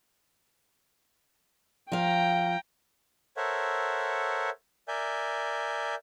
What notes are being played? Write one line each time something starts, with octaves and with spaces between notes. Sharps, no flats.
F3 F5 G5 A#5
A4 A#4 C5 C#5 E5 F#5
A#4 D5 E5 G#5 G6